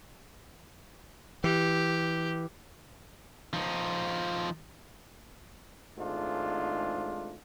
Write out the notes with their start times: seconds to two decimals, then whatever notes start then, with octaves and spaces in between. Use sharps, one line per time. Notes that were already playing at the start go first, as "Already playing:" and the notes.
1.44 E3 G4
3.53 F3 D#4
5.98 G#1 G#2 A3 D4 F4